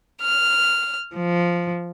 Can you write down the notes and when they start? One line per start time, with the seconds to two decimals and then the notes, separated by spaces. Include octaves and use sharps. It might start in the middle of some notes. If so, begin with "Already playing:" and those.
0.21 F6
1.15 F3